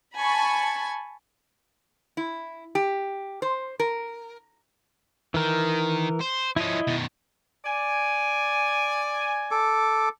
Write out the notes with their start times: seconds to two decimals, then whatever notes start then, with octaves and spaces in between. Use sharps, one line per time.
0.15 G#5 A5 B5 C#6
2.17 E4
2.75 G4
3.42 C5
3.80 A#4
5.34 D#3 E3 A#4
6.20 C5
6.56 F3 C#4 E4 D#5
6.87 B2 D#3
7.65 D5 G#5
9.51 A4 D6